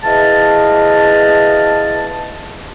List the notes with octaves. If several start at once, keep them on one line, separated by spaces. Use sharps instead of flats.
E4 G#4 B4 D#5 F5 A5